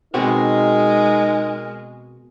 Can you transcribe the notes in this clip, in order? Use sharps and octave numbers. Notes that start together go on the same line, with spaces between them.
B2 G#3 C4 D#4 F#4 A#4